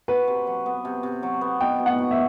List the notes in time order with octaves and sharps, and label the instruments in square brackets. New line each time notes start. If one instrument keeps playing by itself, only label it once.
[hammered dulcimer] F#4 [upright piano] B4
[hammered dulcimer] C3
F#3
B3
C3
C3
F#3
B3
[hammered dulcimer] B2 [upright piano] G5
[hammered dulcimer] B2
[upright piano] F#5
[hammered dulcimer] F#3
[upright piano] E5